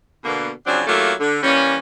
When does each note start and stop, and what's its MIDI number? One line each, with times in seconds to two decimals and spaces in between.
0.24 0.50 47
0.24 0.50 50
0.24 0.50 58
0.66 0.81 49
0.66 0.81 53
0.66 0.81 54
0.66 0.81 60
0.66 0.81 62
0.87 1.12 54
0.87 1.12 57
0.87 1.12 58
0.87 1.12 64
0.87 1.12 65
0.87 1.12 67
1.20 1.39 50
1.43 1.77 52
1.43 1.77 55
1.43 1.77 58
1.43 1.77 61